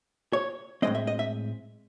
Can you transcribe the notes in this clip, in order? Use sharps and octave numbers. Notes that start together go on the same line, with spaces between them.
C#5
A2 G#3 C4 D#5
E5
D#5
E5